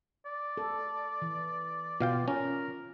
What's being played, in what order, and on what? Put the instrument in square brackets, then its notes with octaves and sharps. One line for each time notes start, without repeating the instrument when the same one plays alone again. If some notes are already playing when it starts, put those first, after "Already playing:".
[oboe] D5
[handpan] A4
E3
[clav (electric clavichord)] B2 F5 G5 [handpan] F4
[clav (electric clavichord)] C#4 [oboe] A#4